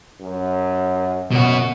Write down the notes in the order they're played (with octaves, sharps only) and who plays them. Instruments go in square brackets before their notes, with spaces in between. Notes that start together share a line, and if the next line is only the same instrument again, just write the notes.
[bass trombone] F#2
[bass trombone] F#2 [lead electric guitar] B2 F#4